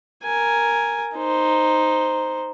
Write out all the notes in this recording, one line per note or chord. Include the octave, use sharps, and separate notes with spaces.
A#4 G#5
D#4 C5